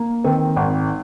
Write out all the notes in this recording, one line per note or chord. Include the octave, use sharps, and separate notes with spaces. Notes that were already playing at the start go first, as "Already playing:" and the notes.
Already playing: A#3
D#3 C4
G#1